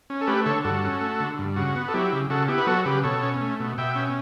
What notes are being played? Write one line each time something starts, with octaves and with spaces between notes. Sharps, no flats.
C#4
A4
A3 G4 B4
D3 A4 C#5
G2 F#4 A4
C#4
A3
D3
G2
C#3 F#4
B3
A4
F#3 E4 G4
C#3
C#3 F#4 A4
B3 E4 G4
B4
F#3 F#4 A4
C#3 G4 B4
B2 A4 C#5
C#4
A3
B2
B2 E5 G5
C#4